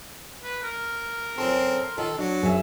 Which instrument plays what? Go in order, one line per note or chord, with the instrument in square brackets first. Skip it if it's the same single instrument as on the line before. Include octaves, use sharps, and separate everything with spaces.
[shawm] B4
A#4
[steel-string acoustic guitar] F#2 A4 [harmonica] C4 [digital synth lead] C6
[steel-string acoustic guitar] D#3 [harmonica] A4
[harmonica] F#3 [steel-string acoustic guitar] D4
[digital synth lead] F#2 [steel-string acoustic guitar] G#4 E5